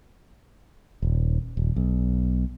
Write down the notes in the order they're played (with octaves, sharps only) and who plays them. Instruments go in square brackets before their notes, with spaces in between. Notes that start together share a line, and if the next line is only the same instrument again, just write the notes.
[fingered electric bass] D#1
D#1
B1